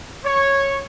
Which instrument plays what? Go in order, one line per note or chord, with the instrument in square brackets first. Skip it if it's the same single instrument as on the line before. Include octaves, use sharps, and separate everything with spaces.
[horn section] C#5